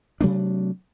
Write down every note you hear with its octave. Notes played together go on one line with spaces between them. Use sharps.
C3 F#3 A3 D4